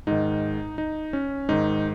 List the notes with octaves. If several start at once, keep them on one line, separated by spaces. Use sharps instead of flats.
G#2 D#3 D#4
D#4
C#4
G#2 D#3 D#4